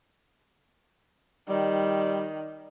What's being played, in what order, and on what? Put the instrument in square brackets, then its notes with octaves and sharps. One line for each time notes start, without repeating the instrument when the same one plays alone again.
[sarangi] D#3 [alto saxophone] G3